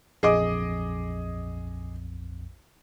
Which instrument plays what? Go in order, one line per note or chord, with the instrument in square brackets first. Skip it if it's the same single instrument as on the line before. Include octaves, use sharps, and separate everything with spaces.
[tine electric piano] A#1 F2 [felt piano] G#4 D#5 D6